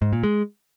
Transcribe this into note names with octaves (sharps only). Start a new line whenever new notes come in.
G#2
A#2
G#3